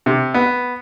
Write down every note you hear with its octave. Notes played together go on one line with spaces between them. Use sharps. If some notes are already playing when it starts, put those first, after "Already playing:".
C3
B3